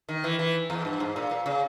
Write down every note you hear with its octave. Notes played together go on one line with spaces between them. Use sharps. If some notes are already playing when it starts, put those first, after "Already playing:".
D#3
E3
E3
E2
G2
G#2
A#2
A#2
C#3